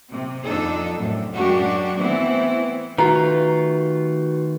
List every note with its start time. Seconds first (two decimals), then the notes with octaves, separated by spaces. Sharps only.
0.10 C3
0.43 F2 D4 D#4 A4 D#5
0.96 F#2 A2 C3
1.34 F#2 G#3 D4 F#4 G4
1.99 E3 A3 B3 C4 E4
2.98 D#3 A3 F4 F#4 B4 A#5